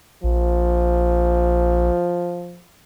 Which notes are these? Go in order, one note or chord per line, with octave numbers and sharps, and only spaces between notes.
A#1 F3